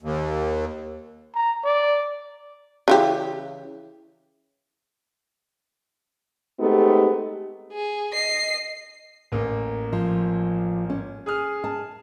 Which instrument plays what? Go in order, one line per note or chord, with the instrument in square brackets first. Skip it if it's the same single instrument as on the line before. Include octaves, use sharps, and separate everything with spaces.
[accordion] D#2
[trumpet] A#5
D5
[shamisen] C#3 E3 G4
[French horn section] G#3 A3 B3 C4 D#4 G4
[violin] G#4
D#5 C7
[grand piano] A1 A#3
[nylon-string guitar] F3
C#4
[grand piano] G#4 D#6 F6
[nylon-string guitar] A5